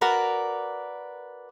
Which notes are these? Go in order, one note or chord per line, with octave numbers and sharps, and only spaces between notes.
F#4 A#4 B4 D5